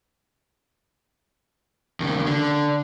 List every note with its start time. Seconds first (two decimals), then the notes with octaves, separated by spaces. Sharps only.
2.00 D#2 C#3
2.26 D3